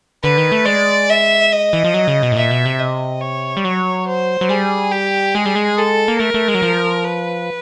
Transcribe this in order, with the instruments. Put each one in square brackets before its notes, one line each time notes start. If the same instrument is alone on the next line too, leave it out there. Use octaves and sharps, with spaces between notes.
[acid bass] D3 [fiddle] B4
[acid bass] D#3
A3
[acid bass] G#3 [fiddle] D5
[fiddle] E5
D#5
[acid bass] E3
F3
F#3
C#3
B2
A2
[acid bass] A#2 [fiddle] E5
[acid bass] B2
C3
[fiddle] D#5
C#5
[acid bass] G3
F#3
[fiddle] C5
[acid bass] F#3
[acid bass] G3 [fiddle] G#4
[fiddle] G4
[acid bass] G#3 [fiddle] G#4
[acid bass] G3
G#3
[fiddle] A4
[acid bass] A#3
[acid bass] A3 [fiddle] A#4
[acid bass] A3
G#3
F#3
F3
[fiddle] B4